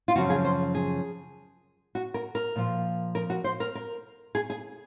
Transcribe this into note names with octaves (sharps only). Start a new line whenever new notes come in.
F4
F#2 C#3 F3 F#4
G#4
C5
G#4
F#4
A#4
A#4
A#2 F3
A#4
F#4
C5
A#4
A#4
G#4
G#4